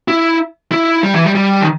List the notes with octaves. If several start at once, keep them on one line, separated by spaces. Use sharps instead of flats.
E4
E4
G3
E3
G3
G3
D#3